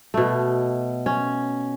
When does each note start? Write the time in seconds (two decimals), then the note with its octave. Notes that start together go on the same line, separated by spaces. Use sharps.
0.14 B2 A3
1.06 C#4